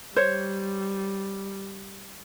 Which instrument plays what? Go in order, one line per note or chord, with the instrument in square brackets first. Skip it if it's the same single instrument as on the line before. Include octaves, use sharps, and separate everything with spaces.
[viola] G3 [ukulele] C5 C#5